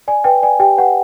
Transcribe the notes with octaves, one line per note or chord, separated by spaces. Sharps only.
D5 G#5
B4 G5
D5 G#5
G4 G5
B4 F#5